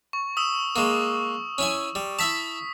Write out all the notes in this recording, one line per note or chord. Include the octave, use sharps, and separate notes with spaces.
C#6
D#6 E6 E7
G#3 A#3 C#6
C#4 E4 G#5
G3
E4 E5 A5 D#6 B6